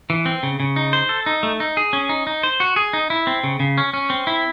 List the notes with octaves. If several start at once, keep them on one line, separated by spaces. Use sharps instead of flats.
E3
C4
C#3
C#3
D#4
C5
A4
D#4
A3
D#4
G#4
C#4
D#4
D#4
C5
F#4
G#4
D#4
E4
C4
C#3
C#3
C#4
C#4
C4
E4